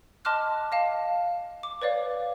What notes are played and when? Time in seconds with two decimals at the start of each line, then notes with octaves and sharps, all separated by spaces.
0.25 D#5 A5 C6 D6 F6 F#6
0.72 D#5 F5 A5
1.63 D6
1.82 B4 C#5 D5 F5